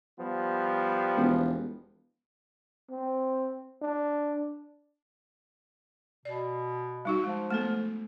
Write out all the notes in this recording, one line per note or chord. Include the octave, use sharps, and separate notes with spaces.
F3 G3 B3
E1
C4
D4
B2 D5
G3 D#4 F#4
F3 G#3
A3 B3 A4